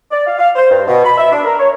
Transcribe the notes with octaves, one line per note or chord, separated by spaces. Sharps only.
D5
F5
F5
C5
G2
B2
B5
E5
D4
A#4
C#5